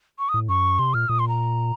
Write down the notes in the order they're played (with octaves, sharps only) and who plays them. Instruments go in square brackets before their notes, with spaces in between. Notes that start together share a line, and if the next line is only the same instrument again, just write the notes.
[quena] C#6
D#6
[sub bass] A2
[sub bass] F#2 [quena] C#6
[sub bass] C3 [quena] C6
[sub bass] A#2 [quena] F6
[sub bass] A#2 [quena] D#6
[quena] C6
A#5